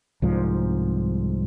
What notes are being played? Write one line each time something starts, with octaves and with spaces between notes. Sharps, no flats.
C2 G#2 F3